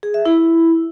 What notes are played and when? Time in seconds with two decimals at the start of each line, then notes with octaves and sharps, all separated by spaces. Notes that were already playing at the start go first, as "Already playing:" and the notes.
0.03 G#4
0.14 E5
0.26 E4